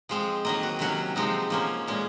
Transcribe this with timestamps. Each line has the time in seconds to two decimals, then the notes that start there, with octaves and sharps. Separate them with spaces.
0.09 F3 G#3 C4
0.45 D#3 F#3 A#3 D#5
0.63 F#4
0.79 C3 D#3 F#3 C#4 F#4
1.16 C3 F3 G#3 C4 D#4
1.50 F3 A#3 C#4
1.87 A#2 G#3 C#4